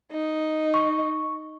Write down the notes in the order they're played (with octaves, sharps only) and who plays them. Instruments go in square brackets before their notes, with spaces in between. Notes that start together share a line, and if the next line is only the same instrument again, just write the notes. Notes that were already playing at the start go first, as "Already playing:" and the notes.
[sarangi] D#4
[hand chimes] C#6